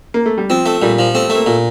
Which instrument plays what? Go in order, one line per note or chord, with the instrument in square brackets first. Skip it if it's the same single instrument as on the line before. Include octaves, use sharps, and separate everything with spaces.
[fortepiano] A#3
A3
G3
[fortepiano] F3 [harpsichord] C4
[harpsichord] A3
[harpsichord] A#2 [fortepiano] G3
[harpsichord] F3
[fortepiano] A3 [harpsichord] C4
[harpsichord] A3
[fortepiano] A#3
[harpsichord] A#2